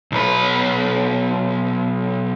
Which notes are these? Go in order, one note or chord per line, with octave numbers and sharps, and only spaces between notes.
B1 B4